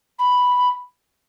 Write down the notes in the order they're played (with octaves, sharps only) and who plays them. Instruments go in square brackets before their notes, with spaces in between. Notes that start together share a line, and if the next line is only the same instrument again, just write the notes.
[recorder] B5